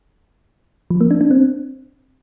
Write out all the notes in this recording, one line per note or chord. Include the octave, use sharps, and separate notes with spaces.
F3
A#3
D4
D4
C4